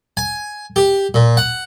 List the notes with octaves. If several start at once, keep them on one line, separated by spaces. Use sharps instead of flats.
G#5
G4
A#2
F#5